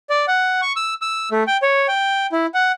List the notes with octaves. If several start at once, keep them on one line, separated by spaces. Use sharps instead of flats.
D5
F#5
C#6
E6
E6
A3
G5
C#5
G5
E4
F#5